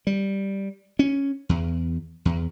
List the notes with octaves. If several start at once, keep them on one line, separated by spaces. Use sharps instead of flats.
G3
C#4
E2
E2